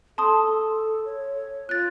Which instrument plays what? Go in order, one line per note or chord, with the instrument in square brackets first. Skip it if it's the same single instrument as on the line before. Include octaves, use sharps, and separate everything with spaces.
[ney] A4 [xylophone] A5 C6 D#6
[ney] C#5
[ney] F4 [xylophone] F#6 A6